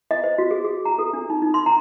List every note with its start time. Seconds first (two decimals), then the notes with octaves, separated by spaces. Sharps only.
0.11 D#5
0.24 C5
0.38 F#4
0.51 G#4
0.64 G#4
0.85 A#5
0.99 A4
1.13 D4
1.30 D#4
1.42 D#4
1.54 C6
1.66 A#5